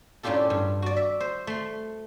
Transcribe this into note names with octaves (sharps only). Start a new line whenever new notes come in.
F#2 A2 D4 F4 G4 A4
G2
F#4 D5
E5
C5
A3 C6